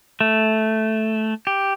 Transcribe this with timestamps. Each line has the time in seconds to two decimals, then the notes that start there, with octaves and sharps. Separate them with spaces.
0.21 A3
1.47 G4